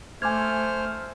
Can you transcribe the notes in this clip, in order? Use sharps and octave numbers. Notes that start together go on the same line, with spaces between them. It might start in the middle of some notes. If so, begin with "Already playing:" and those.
A3 C5 G#5 D6 F6 G#6